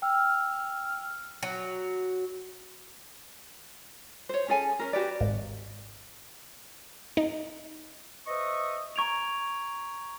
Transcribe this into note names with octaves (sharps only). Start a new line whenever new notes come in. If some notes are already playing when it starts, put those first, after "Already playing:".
G5 E6 F6
F#3
C5 C#5
C#4 G#4 A4 G#5
C#4 D4 A#4
F#4 G4 B4 D5
G#1
D#4
B4 C5 D#5 E5 C#6 D#6
A#5 C#6 G#6 D7 F7